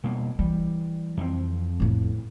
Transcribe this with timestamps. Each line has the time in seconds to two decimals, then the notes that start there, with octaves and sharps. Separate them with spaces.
0.04 B2 G3 A#3
0.39 E3 G3
1.17 F2 C4
1.80 A2 B3